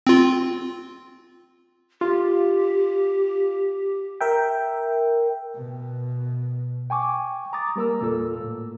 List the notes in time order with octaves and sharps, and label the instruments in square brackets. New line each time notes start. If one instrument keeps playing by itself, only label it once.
[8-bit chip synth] C4 F4
[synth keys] F4 [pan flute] G4
[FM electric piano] A#4 E5 G5
[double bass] B2
[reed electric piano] G5 G#5 C#6 D6
A#5 D6 D#6 A6
G3 A#3 A#4 A#5 E6
E2 A#2 A#3 F4 A4 E6
A2